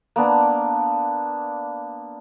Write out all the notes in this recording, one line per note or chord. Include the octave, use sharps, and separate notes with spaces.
A#3 B3 D4